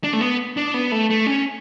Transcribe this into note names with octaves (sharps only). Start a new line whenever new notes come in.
D4
A3
B3
D4
B3
A3
A3
C#4